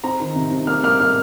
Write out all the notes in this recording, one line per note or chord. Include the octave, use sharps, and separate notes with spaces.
C4 A#5
D#3
C3
C3
A#3 F6
A#3 F6
A#3 F6